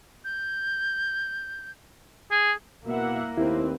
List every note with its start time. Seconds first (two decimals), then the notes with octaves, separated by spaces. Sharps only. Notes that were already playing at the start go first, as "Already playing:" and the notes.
0.24 G6
2.31 G#4
2.85 B2 A#3 E4 E5 F#5
3.38 D#2 A3 C4 E4 B4